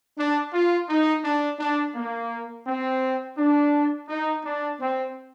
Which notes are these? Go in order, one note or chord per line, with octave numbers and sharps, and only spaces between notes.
D4
F4
D#4
D4
D4
A#3
C4
D4
D#4
D4
C4